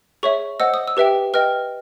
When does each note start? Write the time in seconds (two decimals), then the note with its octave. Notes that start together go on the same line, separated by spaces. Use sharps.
0.23 G#4 C#5 E5 C#6
0.60 C5 D#5 F#5 E6
0.74 D#6
0.88 E6
0.97 G4 B4 E5 G5
1.34 B4 D#5 G5 F6